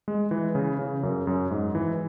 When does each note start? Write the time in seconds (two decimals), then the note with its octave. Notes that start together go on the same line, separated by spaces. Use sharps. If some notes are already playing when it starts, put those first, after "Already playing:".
0.08 G#3
0.31 E3
0.55 C#3
0.79 C#3
1.03 F#2
1.27 F#2
1.51 G#2
1.75 E3